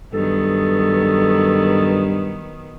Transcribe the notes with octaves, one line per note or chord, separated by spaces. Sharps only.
G2 D#3 F#3 B3 A4